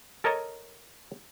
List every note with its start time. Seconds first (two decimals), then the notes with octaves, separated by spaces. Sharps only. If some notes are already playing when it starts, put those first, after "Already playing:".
0.24 A4 A#4 C#5 D#5 A5 A#5